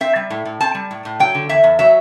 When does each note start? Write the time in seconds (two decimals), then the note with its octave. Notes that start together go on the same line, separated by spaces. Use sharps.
0.01 C4 E5
0.16 G3
0.30 A2
0.45 A2
0.61 C4 A5
0.75 G3
0.91 A2
1.05 A2
1.20 F#3 G5
1.34 D3
1.49 E2 E5
1.64 E2
1.79 F#3 E5